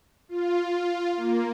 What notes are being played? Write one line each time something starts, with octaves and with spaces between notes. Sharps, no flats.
F4
A#3